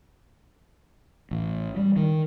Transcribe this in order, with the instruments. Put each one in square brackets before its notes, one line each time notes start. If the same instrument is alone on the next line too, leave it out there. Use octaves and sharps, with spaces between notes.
[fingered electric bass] A1
G3
D#3